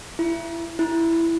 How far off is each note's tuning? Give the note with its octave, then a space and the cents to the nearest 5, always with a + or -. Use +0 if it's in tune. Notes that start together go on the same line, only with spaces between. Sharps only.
E4 +25
E4 +10